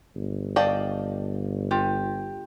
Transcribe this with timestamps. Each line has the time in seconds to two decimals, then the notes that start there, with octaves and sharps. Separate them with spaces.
0.16 G1
0.56 D5 D#5 F5 G5 A5
1.71 F4 G4